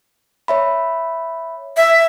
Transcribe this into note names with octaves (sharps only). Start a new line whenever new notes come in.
C#5 E5 B5
E5